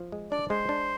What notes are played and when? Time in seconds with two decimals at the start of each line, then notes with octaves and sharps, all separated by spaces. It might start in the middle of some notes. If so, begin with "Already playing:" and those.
Already playing: F3
0.12 G#3
0.31 D4 D5
0.50 G#3 C5
0.69 D4